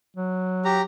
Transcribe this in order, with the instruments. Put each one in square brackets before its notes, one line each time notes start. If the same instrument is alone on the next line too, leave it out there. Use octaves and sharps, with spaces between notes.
[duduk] F#3
[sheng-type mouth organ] G4 A#5